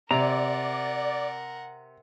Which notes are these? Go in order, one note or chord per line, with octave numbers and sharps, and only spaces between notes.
C3 A#4 D5 F#5 A#5